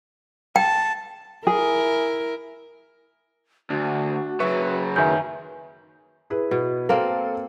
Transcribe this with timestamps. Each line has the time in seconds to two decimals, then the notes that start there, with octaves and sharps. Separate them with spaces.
0.56 G5 A5
1.47 E4 G#4 A#4
3.70 D2 D4 F#4
4.40 C#3 F#3 B4 E5 C#6
4.96 F#2 D#3 B4 E5 G#5 G6
6.30 E4 G#4 B4
6.51 B2
6.89 A#3 C4 A4 A#4 F5